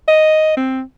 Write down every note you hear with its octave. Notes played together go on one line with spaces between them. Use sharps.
D#5
C4